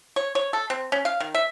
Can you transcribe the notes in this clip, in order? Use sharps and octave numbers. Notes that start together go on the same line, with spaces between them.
C#5
C#5
A4
C4
C#4
F5
D#3
E5